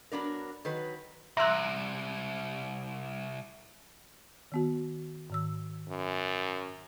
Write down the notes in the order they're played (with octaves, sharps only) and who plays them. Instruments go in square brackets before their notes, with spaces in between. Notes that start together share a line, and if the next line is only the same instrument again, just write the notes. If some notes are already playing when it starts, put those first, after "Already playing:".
[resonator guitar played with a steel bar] F#3 B3 D4 A#4
D#3 F#3 B4
[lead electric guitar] C2 [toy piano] E5 C6 [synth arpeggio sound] A#5 E6 F#6
[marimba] D#3 B3 F#4
G#2 D#3 E6
[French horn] F#2